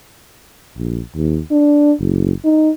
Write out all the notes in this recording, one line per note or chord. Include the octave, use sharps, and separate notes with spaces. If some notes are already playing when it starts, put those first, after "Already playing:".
A#1
D#2
D4
F#1
D#4